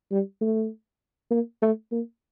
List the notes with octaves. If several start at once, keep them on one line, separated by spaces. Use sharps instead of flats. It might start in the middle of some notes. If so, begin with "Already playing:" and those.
G3
A3
A#3
A3
A#3